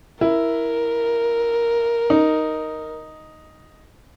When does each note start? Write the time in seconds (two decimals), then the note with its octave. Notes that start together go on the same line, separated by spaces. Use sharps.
0.21 E4 A#4
2.10 D#4